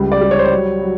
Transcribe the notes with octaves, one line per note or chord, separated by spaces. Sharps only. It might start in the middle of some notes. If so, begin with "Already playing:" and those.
Already playing: C#2 G3
D5
G3
C#5
C5
F#3 C#5
F#3